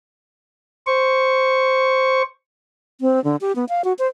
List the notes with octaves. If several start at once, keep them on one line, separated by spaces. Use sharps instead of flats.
C5 C#6
C4
D3
G4
B3
F5
F#4
C5